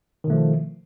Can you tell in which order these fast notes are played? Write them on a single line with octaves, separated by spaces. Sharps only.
D#3 B2 A3 F3